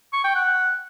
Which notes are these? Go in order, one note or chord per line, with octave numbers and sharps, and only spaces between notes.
C#6
G5
F#5